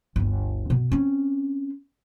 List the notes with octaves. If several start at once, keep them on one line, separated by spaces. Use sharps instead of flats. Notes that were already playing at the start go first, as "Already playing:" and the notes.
G1 D2
B2
C4 C#4